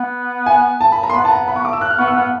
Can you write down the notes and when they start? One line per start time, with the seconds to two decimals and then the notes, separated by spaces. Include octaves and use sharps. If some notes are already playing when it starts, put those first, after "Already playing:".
Already playing: B3
0.46 G#5
0.81 A5
0.92 B5
1.03 A#5
1.10 C6
1.14 B3 B5
1.25 A5
1.31 A#5
1.48 B5
1.56 C#6
1.65 D6
1.73 E6
1.81 F#6
1.90 F6
1.99 B3 C#6
2.07 E6
2.16 B3 F6